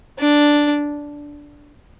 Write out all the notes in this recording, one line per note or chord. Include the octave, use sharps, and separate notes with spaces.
D4